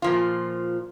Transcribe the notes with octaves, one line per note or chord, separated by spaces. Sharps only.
A#2 F3 F4